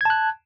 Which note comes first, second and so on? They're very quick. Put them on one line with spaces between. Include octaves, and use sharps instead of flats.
G#6 A5 F#6